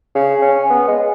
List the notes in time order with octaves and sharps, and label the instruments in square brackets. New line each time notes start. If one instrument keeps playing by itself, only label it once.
[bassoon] C#3
C#4
B3
G#3